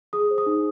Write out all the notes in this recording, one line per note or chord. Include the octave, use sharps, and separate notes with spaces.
G#4 D#6
C5
D#6
D#4